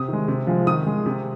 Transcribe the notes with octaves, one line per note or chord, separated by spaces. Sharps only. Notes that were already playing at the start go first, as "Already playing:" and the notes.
Already playing: C3 D#6
D#3 G#3
C3
F3 G#3
D#3 D#6
G#3
C3